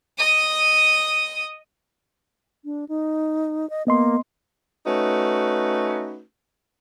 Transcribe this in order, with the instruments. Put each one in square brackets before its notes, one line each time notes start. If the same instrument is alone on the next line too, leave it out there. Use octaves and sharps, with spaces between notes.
[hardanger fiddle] D#5 D#6
[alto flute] D4
D#4
D#5
[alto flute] A#3 [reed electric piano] B3 D#5 C6
[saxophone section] A3 C#4 D#4 F#4 B4